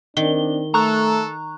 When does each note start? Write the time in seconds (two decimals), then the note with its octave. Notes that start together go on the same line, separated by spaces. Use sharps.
0.17 D#3 C4 D4 G7
0.74 A3 A4 A#5 C#6 F#6